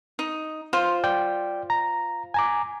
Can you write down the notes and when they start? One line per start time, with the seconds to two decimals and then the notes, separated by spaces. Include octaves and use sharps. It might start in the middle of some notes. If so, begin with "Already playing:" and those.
0.19 D#4
0.73 F4 C5
1.04 D5 G5
1.70 A#5
2.34 G#5 A#5 D6